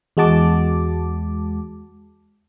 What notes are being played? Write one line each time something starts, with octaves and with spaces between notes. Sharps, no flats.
E2 G#3 F#4 A5 D6